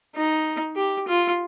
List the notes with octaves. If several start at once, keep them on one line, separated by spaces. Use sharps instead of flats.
D#4
G4
F4